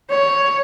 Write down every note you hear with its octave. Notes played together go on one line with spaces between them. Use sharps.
C#5